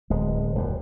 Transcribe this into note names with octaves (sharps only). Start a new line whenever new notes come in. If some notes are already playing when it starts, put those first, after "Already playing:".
D1 G#3
D#1 F#2